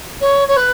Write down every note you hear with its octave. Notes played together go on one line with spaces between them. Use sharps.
C#5
C#5
B4